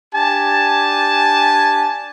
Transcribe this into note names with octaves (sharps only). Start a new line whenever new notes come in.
D4 G4 G#5 A5